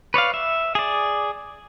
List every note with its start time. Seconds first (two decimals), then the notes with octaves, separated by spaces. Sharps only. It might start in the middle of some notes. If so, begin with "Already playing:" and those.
0.14 B4 C#5 D5 F5
0.34 E5
0.75 G#4 D5